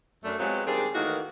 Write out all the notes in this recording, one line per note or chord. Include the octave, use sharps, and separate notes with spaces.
F#2 A3 D4
F#3 G#3 B3 C4 F4 G4
D#2 G3 C4 D4 G#4 D5
A2 D#3 E3 A#3 F#4